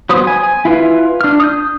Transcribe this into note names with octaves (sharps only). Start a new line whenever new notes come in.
F#3 B3 C5 D#6
G#5
G#5
E4 F4 B4
D4 F6
D#6 G6